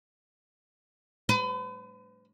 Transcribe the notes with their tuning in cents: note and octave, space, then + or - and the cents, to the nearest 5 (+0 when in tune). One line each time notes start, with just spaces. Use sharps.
B4 +40